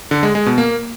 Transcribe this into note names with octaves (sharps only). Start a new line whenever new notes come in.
D3
G#3
G#3
B2
A#3